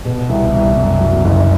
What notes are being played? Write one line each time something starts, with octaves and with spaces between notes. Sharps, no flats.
B2
C2
C2
F#2
F#3
F#1